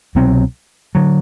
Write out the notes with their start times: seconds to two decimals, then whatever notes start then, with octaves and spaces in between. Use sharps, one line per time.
0.15 C2 B2 F#3 C4
0.95 D3 F#3